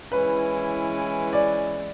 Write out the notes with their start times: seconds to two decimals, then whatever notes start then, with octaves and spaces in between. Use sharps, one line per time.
0.12 E3 G#3 C#4 E4 B4
1.33 D5